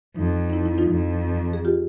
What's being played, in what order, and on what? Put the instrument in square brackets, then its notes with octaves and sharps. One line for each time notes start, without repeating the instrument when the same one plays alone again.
[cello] F2 [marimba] D#4
[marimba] D#4
E4
E4
D#4 F4
[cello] F2
[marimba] G#4
F4 G4